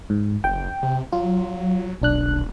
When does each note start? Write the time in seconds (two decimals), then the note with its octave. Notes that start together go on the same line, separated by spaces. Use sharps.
0.10 G#2
0.44 F#1 G5
0.83 C3
1.12 F#3 F4
2.02 D#1 B1 D4 F#6